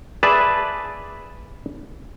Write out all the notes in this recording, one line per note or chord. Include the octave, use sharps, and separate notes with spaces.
G#4 B4 D5 E5 A5